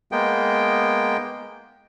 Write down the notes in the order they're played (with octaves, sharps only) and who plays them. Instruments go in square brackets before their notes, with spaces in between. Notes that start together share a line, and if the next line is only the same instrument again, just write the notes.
[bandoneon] G#3 A#3 B3 G5